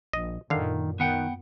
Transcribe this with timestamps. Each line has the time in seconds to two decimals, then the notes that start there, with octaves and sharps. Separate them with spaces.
0.13 A#1 D#5
0.50 F#2 A#2 D3 D#3 F5
1.00 D#3 B3 F#5 G5